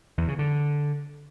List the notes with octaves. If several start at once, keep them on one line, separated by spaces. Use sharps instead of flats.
E2
C#3
D3